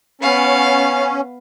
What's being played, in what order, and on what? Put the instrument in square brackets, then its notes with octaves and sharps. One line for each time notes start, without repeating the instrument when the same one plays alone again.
[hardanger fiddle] B3 F5 [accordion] C#4